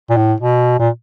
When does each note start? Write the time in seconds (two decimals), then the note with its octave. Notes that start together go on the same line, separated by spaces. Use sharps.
0.10 A#2
0.17 A2
0.41 B2
0.79 A#2